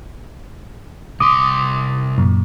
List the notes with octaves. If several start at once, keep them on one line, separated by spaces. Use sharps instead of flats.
C2 C6 D6 D#6
F#2 A#2